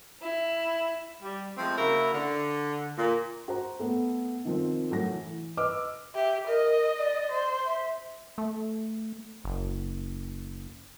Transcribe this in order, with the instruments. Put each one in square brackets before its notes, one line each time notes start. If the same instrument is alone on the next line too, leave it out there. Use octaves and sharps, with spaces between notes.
[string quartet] E4
[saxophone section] G3
F3 G#3 A3 C4
C#3 A#3 E4 F#4 A#4
D3
A#2
[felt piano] F#4 C5 A#5
A3 B3
D#3 F3 C4
A2 F#3 A4 A#6
E3
B4 D#5 D6 E6 F6
[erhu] G4 [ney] E5
[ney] A#4 [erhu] D#5
[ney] D5
[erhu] C5
[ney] E5
[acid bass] A3
F#1